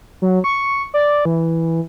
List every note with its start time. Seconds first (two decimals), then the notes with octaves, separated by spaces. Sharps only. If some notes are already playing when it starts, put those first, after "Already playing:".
0.22 F#3
0.44 C#6
0.94 D5
1.25 E3